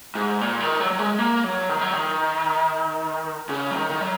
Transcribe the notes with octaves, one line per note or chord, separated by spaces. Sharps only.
G#2
A#2
D#3
F#3
F#3
G#3
A#3
F#3
D#3
F#3
D#3
C#3
F#3
D#3
D#3
F#3